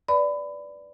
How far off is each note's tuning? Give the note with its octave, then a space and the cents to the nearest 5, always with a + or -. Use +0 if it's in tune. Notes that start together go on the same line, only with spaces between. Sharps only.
B4 +0 D5 -5 B5 +25